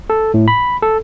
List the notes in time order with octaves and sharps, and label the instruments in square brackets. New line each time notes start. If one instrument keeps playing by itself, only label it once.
[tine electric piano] A4
A2
B5
A4